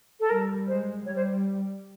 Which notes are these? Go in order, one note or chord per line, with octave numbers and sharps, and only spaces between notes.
A4
G3 A#4
G#3 C5
G3 C#5
C5